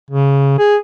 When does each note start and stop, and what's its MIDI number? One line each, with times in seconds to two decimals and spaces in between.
0.10 0.58 49
0.59 0.76 68